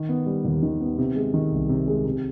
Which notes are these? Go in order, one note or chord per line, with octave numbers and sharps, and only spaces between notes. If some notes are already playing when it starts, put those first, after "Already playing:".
Already playing: D#3
B3
G3
D#2
D#3
B3
C3
G#3
D#3
C2
C3
G#3
C3